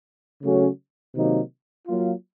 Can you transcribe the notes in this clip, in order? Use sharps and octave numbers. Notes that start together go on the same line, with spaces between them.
C#3 F#3 A3 C#4 F#4
C3 D#3 F#3 A#3 D#4
F#3 A#3 F4